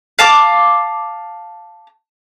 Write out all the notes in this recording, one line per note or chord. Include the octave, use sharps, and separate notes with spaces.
F5 A5 D6